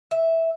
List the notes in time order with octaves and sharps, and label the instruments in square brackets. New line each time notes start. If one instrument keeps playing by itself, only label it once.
[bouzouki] E5